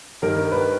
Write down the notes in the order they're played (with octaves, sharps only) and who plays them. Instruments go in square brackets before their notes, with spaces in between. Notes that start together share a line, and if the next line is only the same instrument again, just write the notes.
[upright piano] G2 D#3 G3 A#4
B4